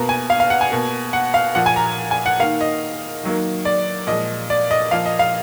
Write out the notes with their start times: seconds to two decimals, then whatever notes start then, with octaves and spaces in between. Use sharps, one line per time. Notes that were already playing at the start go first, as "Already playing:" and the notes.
Already playing: B2 A#3 A#5
0.09 G#5
0.30 F5
0.40 F5
0.50 F#5
0.61 G#5
0.71 B2 A#3
1.13 F#5
1.34 F5
1.55 A#2 F3 A#3 F#5
1.66 G#5
1.76 A#5
2.11 G#5
2.26 F#5
2.39 D#3 A#3 F5
2.61 D#5
3.24 D#3 F#3 A#3
3.65 D5
4.07 A#2 F3 G#3 D#5
4.50 D5
4.71 D#5
4.91 A#2 F3 A#3 F5
5.06 D#5
5.19 F5